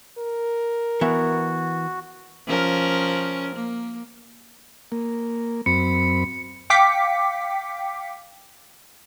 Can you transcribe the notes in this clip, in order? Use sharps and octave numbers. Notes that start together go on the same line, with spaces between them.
A#4
E3 B3 F#4 E5
F3 C#4 A#4
A#3
A#3
F#2 C4 B5 C#7
F5 G5 D6 B6 C#7